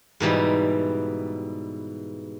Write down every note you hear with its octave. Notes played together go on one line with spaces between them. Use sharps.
G#2 B2 E3 G3